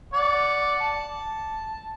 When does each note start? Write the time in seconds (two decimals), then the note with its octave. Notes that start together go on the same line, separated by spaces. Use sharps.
0.13 D5 F#5
0.81 A5